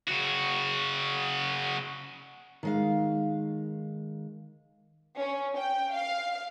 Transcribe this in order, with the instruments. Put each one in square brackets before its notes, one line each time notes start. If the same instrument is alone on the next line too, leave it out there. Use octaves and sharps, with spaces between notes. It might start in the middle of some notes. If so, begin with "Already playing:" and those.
[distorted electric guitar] C#3 F#4
[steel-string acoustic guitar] D#3 G#3 F5
[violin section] C#4
G5
F5